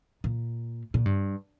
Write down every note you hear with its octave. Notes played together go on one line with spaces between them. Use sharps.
A#2
A#2
G2